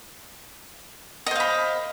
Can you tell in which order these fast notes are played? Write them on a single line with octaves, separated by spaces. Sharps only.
D#5 C5 F5 B5